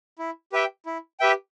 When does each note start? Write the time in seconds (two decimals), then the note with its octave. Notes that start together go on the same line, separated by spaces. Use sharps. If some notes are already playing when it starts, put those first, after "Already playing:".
0.19 E4
0.52 G4 B4 E5 G5
0.86 E4
1.20 G4 B4 E5 G5